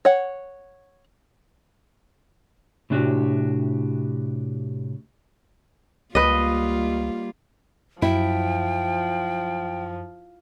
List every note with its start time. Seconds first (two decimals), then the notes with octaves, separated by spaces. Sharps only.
0.05 C#5 F#5
2.90 A2 C3 D4 E4 F#4 G4
6.15 C#2 G3 A#3 F4 B4 D#5
8.02 F#2 F3 E4 G5